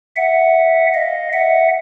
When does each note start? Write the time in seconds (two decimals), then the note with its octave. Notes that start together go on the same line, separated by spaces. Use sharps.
0.16 E5 F#5
0.94 D#5 F5
1.33 E5 F#5